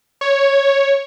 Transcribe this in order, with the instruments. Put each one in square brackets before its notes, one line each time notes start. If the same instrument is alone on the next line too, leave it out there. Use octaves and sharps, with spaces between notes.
[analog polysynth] C#5